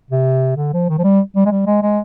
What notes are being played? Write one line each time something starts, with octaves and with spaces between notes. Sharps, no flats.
C3
D3
F3
D#3
F3
G3
G3
G#3
G3
G#3
G#3